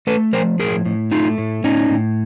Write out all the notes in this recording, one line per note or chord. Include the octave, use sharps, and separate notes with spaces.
A3 A4 B4
F3 A#4 C5
A2 G#4 A#4
A2
A3 D#4 F4
A2
A2 C#4 D#4
A2